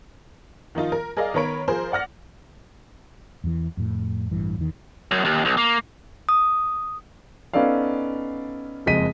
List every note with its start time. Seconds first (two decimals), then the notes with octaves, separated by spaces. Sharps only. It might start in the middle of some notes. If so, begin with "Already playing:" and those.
0.75 D#3 F3 D#4 F4
0.92 A#4
1.17 G#4 A#4 D5 D#5 F5
1.34 D#3 B3 A#4 C#5 B5 D7
1.68 F3 G#4 A#4 C5
1.92 D5 F#5 F6 A#6
3.44 E2 E3
3.77 F2 A2
4.31 A1 G2 E3
4.58 E2 D#3
5.11 F#2
5.25 D#2
5.45 B1
5.57 A#3
6.29 D#6
7.53 B3 C#4 D#4 A4 D5 F5
8.86 F#1 F2 G#3 D#5 B6 D#7